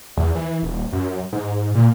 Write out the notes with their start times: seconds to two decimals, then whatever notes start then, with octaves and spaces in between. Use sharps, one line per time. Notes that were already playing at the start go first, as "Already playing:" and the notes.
0.17 E2
0.35 E3
0.62 D#1
0.92 F#2
1.32 G#2
1.75 A#2